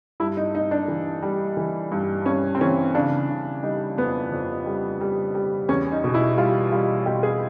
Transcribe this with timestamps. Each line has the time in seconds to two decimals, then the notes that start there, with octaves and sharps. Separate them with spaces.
0.20 G2 E4
0.37 D#4
0.55 G2 D#4
0.71 D4
0.88 E3
1.22 G3
1.57 E3
1.92 G2
2.26 G2 C#4
2.55 C4
2.61 E3 C#4
2.95 C#3 D4
3.28 C#3
3.63 G3 D#4
3.97 F2 B3
4.32 F2
4.66 G3
5.01 G3
5.35 G3
5.69 E2 C#4
5.92 D#4
6.04 B2
6.14 E4
6.37 G3 F4
6.72 G3 F4
7.06 B2 G4
7.23 G#4